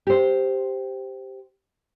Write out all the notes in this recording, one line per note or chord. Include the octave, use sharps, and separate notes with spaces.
G4 C5